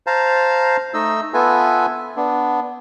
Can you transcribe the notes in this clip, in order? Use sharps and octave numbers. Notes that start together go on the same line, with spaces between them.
C5 F5 A5 A#5
A3 D#4 D#5 E6
B3 F4 A4 B4 E5 G#5
B3 D4